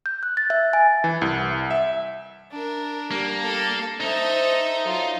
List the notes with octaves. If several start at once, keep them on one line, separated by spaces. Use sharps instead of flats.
G6
F#6
A6
E5
G#5
E3
C2
E5
D4 A#4
G3 A#3
A4
D#4 A4 C5 D#5 E5
F#3 F4